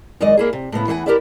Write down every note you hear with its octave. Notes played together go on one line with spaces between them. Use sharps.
F#2 D#3 G#3 D5 D#5
A#3 E4 G#4
C3
A2 C#3 B3 E4
E2 E3 A4 F#5 G#5
E4 G4 A#4 B4 D5 E5